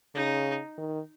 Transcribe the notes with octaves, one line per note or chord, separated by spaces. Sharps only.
C#3 D#4
D#3